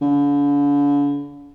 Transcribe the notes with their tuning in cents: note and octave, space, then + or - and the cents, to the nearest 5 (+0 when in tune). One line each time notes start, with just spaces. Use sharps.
D3 -45